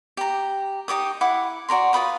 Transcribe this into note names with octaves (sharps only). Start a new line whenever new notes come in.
G4 A#5
D#4 G4 D6 D#6
E4 F#5 D6
F#4 D5 A#5 C6
F4 B4 B5 D#6